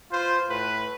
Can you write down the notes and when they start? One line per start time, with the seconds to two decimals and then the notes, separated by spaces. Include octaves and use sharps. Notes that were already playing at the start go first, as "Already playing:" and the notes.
0.11 F4 B4 C5
0.49 A2 B4